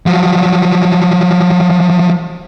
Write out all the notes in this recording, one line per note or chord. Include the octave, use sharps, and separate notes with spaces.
F3 F#3